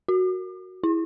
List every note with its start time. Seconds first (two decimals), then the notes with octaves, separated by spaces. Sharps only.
0.08 F#4
0.83 E4